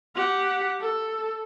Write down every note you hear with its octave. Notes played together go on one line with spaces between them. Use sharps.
G4 F#5
A4